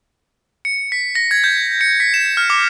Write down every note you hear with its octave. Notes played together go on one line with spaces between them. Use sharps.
C#7
B6
A#6
G#6
G6
C#7
B6
E7
F6
D6